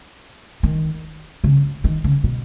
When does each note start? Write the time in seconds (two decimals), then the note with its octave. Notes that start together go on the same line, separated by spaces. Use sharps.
0.63 D#3
1.44 C#3
1.84 D#3
2.04 C#3
2.24 B2